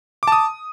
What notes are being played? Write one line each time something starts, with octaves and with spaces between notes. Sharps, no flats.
A5 D6 D#6